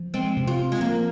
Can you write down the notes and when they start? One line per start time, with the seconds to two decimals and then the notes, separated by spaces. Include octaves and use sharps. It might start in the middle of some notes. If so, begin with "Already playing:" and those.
Already playing: F3
0.14 G#3 C4
0.37 C3
0.48 F4
0.59 C4
0.72 G#3
0.80 F3 A#3